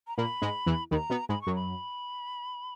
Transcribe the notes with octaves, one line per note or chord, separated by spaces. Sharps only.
A#5
A#2 A#3 B5
G#2 G#3
E2 E3
D#2 D#3 B5
A#5
B2 B3
G#2 G#3 B5
C#6
F#2 F#3
B5